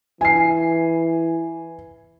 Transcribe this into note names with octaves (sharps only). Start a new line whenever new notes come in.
E3 G#5 C7